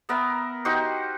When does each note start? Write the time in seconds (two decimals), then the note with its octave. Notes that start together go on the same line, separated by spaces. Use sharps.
0.09 B3 A#4 E5
0.65 D#4 F#4 G4 C5